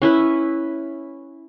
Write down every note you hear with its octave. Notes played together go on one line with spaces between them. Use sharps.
C#4 E4 B4